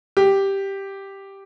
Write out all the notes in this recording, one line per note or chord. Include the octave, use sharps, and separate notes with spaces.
G4